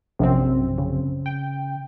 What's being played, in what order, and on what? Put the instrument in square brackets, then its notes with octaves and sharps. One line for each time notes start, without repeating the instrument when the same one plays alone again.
[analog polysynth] A#1 F#2 C4 [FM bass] C3
[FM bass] C#3
[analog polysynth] G5